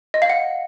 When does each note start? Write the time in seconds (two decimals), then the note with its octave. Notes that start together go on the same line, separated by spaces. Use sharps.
0.14 D#5
0.22 F5
0.30 F#5